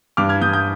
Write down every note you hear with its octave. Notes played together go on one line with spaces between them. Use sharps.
G2 D6 F6
F6 G#6
G2 D#6 G6
D#6 G6